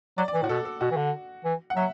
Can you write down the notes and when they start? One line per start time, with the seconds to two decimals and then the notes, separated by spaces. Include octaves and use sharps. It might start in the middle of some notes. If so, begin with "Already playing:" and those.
0.18 F#3 D5
0.28 D5
0.34 E3
0.42 A2 F#4
0.49 B2 A4
0.65 A4
0.81 B2 F#4
0.91 E3
0.97 D3
1.45 E3
1.70 F#5
1.76 F#3 E5